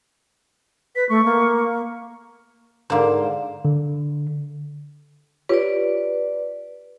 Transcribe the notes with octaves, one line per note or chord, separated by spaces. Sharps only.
B4 B6
A3 C#6
A#3
G#2 D3 A#3 C5
D3
F4 G4 B4 C#5 D5